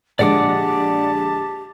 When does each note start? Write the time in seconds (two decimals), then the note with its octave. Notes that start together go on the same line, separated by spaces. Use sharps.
0.19 A#1 D3 G#3 G4 D5 F#5 A5 D6